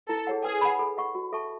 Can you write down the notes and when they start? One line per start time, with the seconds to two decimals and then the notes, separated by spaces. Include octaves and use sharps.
0.09 E4 A4
0.27 G#4 C#5 F#5
0.45 G#4 B4
0.61 F#5 B5
0.79 A4
0.97 D#5 F#5 C#6
1.15 F#4
1.33 A4 E5 A5 C#6